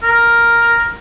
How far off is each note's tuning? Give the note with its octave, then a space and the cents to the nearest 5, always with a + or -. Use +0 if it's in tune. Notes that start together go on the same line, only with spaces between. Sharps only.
A#4 +5